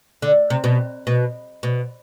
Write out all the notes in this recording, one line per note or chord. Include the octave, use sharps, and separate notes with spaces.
D3
C3
B2
B2
B2